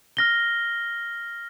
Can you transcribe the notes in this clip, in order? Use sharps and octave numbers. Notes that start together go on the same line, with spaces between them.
F6 A#6 G7